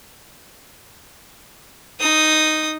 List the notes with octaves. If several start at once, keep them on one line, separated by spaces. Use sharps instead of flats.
D#4 D#6